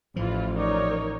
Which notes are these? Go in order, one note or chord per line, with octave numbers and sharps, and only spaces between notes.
A1 E3 F3 F4
D#4 A#4 C#5 D5